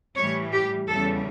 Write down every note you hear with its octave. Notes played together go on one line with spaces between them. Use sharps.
A2 E3 G3 C#5
G4
E2 C#3 E3 G3 A4